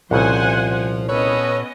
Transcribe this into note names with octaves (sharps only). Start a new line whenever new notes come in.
C2 A#2 C#3 F3 C5 F#5 G#5
B3 C#4 A4 B4 C#5 D#5